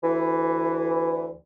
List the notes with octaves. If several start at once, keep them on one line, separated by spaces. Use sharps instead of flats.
D2 E3